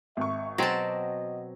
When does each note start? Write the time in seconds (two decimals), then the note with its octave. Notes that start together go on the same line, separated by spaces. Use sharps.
0.17 G#1 E5 C#6
0.58 B2 F#3 C4 D#5 A5 A#6